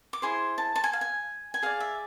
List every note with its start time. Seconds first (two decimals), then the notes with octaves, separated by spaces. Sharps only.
0.13 D6
0.22 E4 G#4 C5 C6
0.58 A5
0.76 A5
0.84 G#5
0.93 F5
1.01 G#5
1.54 G#5
1.62 G#4 D5 F5
1.80 E5